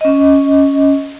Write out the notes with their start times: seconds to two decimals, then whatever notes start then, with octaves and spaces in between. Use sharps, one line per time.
0.01 C#4 D#5